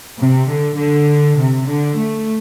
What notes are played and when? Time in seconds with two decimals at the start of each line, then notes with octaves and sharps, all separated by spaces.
0.18 C3
0.48 D3
0.77 D3
1.37 C3
1.67 D3
1.97 A3